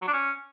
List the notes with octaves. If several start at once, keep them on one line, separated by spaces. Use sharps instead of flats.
F#3
D4
C#4